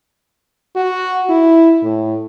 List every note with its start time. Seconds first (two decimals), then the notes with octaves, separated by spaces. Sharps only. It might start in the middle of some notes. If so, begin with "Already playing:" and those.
0.76 F#4
1.29 E4
1.83 A2